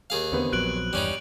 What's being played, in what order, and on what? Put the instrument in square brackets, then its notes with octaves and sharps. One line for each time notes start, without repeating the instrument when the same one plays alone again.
[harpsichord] D#2 G#4 F5
[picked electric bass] E2 D3 [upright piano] B3 C4
[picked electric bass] A#1 F3 F#3 [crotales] F#6 D7 F#7
[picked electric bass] G#1 E2 G2 [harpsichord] G3 C#4 D#4